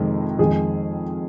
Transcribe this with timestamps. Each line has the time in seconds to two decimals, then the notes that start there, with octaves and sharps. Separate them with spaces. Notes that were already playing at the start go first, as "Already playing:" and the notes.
Already playing: F2 C3 D#3 G#3
0.39 F2 D#3 G#3 G#4